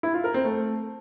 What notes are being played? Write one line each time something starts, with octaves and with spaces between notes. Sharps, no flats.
E4
F4
A#4
C4
A3